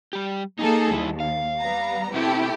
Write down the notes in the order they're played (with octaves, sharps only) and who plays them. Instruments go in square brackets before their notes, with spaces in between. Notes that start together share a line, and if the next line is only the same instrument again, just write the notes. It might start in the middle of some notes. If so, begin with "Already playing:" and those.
[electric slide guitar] G3 G4
[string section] A#3 G#4 A4 [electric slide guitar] D#4
[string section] D#2 [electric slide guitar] G3 E4
[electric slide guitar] F5
[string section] G3 B3 A#5
[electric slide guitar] B2 C4 [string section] A3 E4 G4